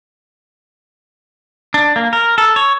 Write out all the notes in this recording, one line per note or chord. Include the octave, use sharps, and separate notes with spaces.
D4
A#3
A#4
A4
C#5